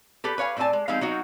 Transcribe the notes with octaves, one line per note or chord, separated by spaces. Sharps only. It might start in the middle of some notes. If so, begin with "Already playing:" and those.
G4 A4 B4
B4 C#5 F5 G#5
A2 C4 D5 G#5 A5
G#3
F3 G#3 C4 D#4 G4 F5
F#3 C4 D#4 F4 F#4